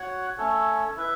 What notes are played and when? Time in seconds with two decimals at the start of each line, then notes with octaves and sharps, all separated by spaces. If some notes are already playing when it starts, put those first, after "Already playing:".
Already playing: F#4 C#5 F#5
0.38 A3 C#4 A4 C#5
0.96 E4 B4 E5